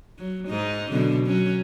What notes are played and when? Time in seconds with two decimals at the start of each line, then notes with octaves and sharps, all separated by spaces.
0.18 F#3
0.47 G#2 D#4
0.92 F#2 B2 D3
1.26 F#3 C#4